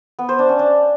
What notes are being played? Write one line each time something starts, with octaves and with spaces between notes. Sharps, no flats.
B3
C5
D4
C#4
D4